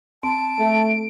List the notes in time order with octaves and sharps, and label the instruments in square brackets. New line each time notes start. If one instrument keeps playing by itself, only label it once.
[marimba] C4 [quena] A5 [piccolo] D7
[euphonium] A3